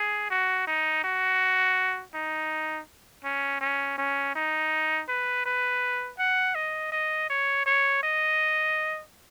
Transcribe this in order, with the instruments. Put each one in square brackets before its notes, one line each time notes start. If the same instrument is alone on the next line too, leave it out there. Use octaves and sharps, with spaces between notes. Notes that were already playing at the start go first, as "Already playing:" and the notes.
Already playing: [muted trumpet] G#4
F#4
D#4
F#4
D#4
C#4
C#4
C#4
D#4
B4
B4
F#5
D#5
D#5
C#5
C#5
D#5